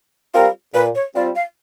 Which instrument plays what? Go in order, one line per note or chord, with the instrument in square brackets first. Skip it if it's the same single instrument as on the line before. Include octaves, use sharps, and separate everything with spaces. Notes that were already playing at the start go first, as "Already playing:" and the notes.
[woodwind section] G3 C4 F4 [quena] A#4
[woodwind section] A#2 [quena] B4
[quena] C#5
[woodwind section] G3 C4 F4 [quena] D5
[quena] F5